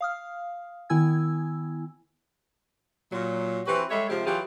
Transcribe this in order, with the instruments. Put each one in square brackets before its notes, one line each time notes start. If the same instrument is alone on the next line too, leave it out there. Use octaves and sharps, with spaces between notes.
[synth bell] F5 D#6 F6
D#3 B3 E4 G#5 E6 G#6
[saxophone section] A#2 F#3
E3 C4 F#4 G4 B4
G3 G#3 A4 C#5 E5
C3 F3 G#3 G4
E3 F#3 F4 G4 G#4